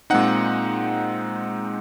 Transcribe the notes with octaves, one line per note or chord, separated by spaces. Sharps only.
A#2 G#3 C4 D#4 F#5